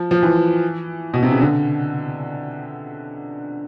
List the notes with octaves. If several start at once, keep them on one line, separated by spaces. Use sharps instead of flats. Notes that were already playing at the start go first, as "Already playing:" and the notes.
Already playing: F3
F3
E3
B2
C3
C#3
D3